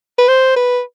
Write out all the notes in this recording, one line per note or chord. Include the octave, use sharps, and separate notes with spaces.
B4
C5
B4